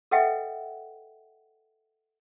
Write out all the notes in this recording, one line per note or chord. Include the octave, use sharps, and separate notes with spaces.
A4 B4 D#5 E5 F#5 G5